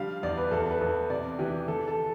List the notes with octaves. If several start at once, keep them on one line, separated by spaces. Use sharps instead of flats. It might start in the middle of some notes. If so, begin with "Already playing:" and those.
Already playing: D3 F3 G3 F5
E2 D5
B4
E2 A4
B4
E2 A4
C3 D5
E3 G4
E3 A4
A4